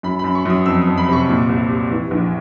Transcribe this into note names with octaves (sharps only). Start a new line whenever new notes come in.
F#2 B5
B5
F#2
C#6
F#2 D#6
F2 E6
D#6
F2
B5
C3 C#6
A#2
C2
G3
E3
A#1